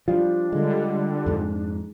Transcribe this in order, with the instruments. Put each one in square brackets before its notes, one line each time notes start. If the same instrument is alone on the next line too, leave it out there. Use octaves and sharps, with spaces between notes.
[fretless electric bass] F3 G3 [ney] D4 [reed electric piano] F4
[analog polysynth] D3 G3 [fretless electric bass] G#3
[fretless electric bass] F2 G#2